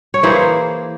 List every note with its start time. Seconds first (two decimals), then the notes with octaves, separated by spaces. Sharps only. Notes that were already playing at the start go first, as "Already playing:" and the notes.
0.14 C#5
0.23 E3 A#3 E4 G#4 C5